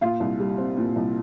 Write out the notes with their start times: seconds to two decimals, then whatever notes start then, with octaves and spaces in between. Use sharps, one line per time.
0.01 A#2 F4 F5
0.20 C2
0.40 G3
0.58 C4
0.77 A#2
0.96 C2